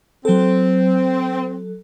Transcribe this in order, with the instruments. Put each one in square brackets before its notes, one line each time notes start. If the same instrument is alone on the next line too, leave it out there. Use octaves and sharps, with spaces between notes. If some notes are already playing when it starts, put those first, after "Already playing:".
[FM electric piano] F#3 A4 [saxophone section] C4